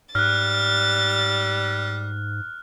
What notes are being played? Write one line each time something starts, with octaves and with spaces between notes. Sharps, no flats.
G#2 G3 F6 F#6 A6